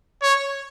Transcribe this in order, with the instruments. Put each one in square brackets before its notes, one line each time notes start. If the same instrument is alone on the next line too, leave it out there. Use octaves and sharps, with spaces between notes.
[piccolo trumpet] C#5